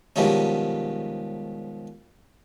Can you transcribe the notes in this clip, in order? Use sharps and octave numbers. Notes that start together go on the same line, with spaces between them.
G#2 B2 D#3 F3 G3 C#4